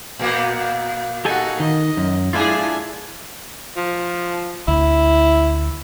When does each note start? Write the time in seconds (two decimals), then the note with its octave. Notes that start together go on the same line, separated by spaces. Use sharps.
0.19 A#2 A#3 B3
1.25 D#4 F#4 G4 A4 G#5
1.60 D#3 D#5
1.97 F#2
2.33 G#2 D4 E4 F4 G#4 G#5
3.76 F3
4.68 D2 E4